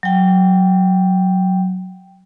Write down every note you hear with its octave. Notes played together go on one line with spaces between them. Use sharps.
F#3 G5